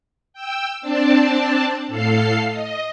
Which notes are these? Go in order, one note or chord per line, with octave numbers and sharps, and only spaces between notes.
G5 E6
C4 D4 D5 A5
A2 A4 F5 C7
D#5